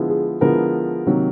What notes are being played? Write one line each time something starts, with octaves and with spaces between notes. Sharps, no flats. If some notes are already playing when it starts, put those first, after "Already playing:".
Already playing: D3 F3 G#3 B3 E4
G#4
D3 F3 G#3 B3 E4 A#4
C3 D#3 F#3 A#3